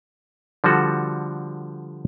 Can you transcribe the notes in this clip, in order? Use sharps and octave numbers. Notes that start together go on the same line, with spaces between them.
D3 F3 G3 F#4 A4